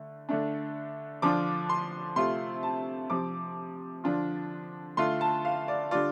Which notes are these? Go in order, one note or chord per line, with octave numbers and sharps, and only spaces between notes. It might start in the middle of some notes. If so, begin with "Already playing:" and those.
Already playing: D3 A3
D3 A3 D4
D3 F3 D4 F4 D6
C6
C3 A3 C4 F4 C6
A5
C3 F3 C4 D6
D3 F3 D4 F4
D3 A3 D4 F4 C6
A5
F5
D5
D3 G3 F4 D5